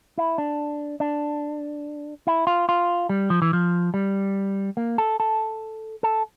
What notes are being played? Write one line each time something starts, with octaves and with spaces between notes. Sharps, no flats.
E4
D4
D4
E4
F4
F4
G3
F3
E3
F3
G3
A#3
A4
A4
A4